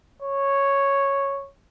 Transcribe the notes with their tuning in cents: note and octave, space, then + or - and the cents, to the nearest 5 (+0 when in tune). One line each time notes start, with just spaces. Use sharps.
C#5 -5